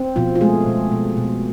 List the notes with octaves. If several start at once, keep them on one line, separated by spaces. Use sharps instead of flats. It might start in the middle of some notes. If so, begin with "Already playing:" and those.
Already playing: C4
B2 F3 F4
F4
G#3 A3 G#4
B2
B2
B2